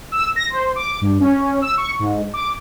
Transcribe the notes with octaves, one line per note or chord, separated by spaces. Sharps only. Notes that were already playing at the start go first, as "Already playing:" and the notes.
E6
A#6
C5
D6
G2
C#4
E6
C#6
G#2
D6